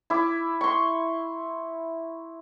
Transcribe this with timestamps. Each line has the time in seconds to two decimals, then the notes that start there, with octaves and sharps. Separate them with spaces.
0.10 E4 D6
0.61 C6 C#6